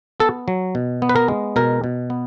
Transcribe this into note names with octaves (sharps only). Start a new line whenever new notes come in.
B3 A4
F#3
B2
B3
B4
A#4
G#3
B2 A#4
B2
B3